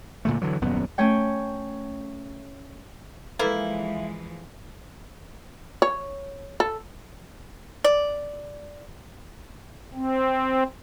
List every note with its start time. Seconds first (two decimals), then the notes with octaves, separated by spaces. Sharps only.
0.25 A#2 D3 A3
0.41 D3 E3 F#3
0.61 D#1 F#2 B3
0.98 A3 C#4 C#5 G5
3.39 E3 F3 G#3 A#3 E4 A4 B4
5.82 C#5
6.60 A4
7.84 D5
9.94 C4